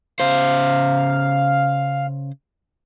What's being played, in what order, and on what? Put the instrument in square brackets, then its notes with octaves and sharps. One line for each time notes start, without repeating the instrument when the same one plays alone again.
[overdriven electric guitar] C#3 C5 [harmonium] F5